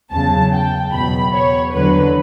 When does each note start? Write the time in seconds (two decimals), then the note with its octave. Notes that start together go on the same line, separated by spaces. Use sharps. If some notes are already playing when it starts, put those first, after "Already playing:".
0.11 E2 C#3 F#3 A5
0.52 G5
0.92 E2 B2 F#3 B5
1.34 C#5
1.74 E2 D3 F#3 B4